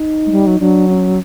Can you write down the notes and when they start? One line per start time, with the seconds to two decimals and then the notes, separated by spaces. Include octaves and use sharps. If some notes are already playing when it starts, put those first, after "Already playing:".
Already playing: D#4
0.26 G#3
0.31 G3
0.47 F#3
0.60 F#3 D4
0.89 C#4